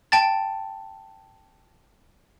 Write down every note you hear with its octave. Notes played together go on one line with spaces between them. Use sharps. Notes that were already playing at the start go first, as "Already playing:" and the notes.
G5 A5 A6